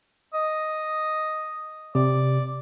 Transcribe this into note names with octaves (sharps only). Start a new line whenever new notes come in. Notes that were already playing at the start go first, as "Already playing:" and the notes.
D#5
C3 D5